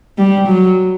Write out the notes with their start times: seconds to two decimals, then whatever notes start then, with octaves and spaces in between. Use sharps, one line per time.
0.18 G3
0.47 F#3